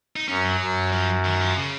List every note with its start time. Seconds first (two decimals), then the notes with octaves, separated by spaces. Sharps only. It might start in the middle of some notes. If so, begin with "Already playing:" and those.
0.16 D#4
0.28 F#2 C#4
0.44 F#3
0.60 F#2
0.92 F3
1.25 D#3
1.41 F3
1.57 C#3